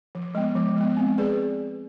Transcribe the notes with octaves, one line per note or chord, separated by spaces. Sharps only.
F3
G#3 B3
F3
G#3 B3
C4
G#4 B4 D5